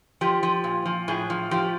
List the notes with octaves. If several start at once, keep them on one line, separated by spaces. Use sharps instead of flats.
F3 G4
F3
A#2
F3
A2 G#4
F3
F3 G4